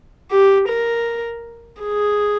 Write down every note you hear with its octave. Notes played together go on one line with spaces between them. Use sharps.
G4
A#4
G#4